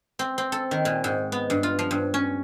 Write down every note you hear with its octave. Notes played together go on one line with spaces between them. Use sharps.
C4
C4
A4
D#3
A#2
G#2
B3
G2
F4
F3
G2
C#4